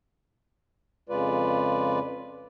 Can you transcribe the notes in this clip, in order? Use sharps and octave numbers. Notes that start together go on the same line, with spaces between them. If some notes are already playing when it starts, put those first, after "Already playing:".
F2 C#3 G#3 F4 B4 D5